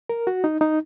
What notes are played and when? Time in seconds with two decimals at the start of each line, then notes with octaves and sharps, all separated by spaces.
0.09 A#4
0.27 F#4
0.44 D#4
0.61 D#4